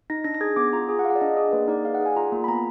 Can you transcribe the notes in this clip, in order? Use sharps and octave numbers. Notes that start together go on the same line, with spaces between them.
D#4 A#6
D4 A#6
A#6
G#4 G#6
B3 D6
F4 A#5
G#4
F#5
G#4 F5
F#5
D5
D4 D#5
G#4 D5
A#3 B4
D#4 D5
G#4 F5
F#5
G#4
G#5
F4 A#5
A#3
B5
B3 A#5